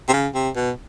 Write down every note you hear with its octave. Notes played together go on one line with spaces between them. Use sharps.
C3
C#3
C3
B2